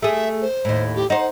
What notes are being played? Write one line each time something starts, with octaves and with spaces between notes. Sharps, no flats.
A3 G#4 E5
C5
D#2 A2
G4
D#4 C5 F#5